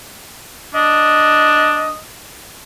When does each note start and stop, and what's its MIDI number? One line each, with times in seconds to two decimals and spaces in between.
0.75 1.91 62
0.75 1.97 75